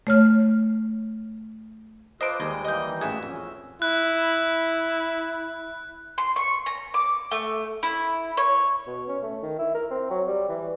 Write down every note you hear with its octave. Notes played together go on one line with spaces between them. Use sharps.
A3 C#5 F6
F4 A4 B4 C5 D#5 D6
D#2 G3 G#3 D#5
E3 G3 A#3 D#5 G6
A1 F#4 G#4 E5
F2 C#4
E4 F#6
C6
C#6
A#5
D6
A3
E4
C#5
B2
C#4
A3
D#3
E4
A#4
C4
F#3
G3
E3